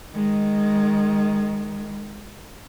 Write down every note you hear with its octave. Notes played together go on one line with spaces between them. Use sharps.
D#3 G#3